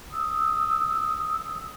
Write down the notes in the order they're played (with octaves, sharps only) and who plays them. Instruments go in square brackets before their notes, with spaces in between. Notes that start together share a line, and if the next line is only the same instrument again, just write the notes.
[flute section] D#6 E6